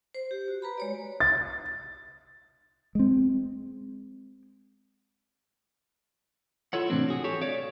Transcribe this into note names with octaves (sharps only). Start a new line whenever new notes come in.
C5
G4
F#4
B4 A#5 B5
G#3 C#5 D5
A6
G#3 C4
E4 F4 A4 C#5 F#5
A2 C3 E3 F3 C4 D4
F#4 G#4
G4 A4 C#5
C#5 D5 F5